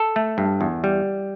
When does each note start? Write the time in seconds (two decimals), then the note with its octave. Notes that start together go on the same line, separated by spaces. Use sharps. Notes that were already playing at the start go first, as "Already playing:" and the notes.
Already playing: A4
0.16 A3
0.38 G2
0.61 E2
0.84 G3